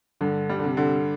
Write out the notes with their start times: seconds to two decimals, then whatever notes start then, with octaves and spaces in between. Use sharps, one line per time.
0.21 G2 D3
0.49 G3
0.59 D3
0.64 C3
0.77 D3